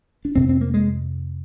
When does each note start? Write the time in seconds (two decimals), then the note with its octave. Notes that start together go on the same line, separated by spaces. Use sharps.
0.25 D4
0.36 F2 C3 C4
0.49 C4
0.61 A#3
0.74 G#3